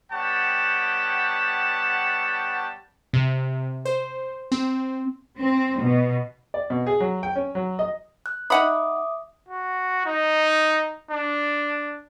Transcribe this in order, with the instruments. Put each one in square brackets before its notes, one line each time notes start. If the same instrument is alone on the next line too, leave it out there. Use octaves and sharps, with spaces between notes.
[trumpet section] G3 B3 C#5 F#5 G5 A5
[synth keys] C3
C5
C4
[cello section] C4
B2
[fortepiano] D5
B2
G#4
F#3
G5
C#4
F#3
D#5
[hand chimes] F#6
[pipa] D#4 F#5 B5 [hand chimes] E5 D6 D#6
[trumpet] F#4
D#4
D4